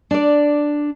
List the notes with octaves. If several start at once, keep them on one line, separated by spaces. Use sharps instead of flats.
D4 D5